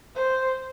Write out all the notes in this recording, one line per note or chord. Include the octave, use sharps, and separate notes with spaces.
C5